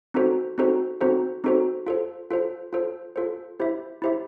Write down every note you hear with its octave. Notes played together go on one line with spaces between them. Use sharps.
C4 D#4 F#4 A4 C5
C4 D#4 F#4 A4 C5
C4 D#4 F#4 A4 C5
C4 D#4 F#4 A4 C5
F4 A4 C5
F4 A4 C5
F4 A4 C5
F4 A4 C5
E4 G4 C5 E5
E4 G4 C5 E5